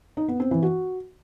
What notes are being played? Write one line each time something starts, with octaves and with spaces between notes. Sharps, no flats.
D#4
B3
C4
E3
F#4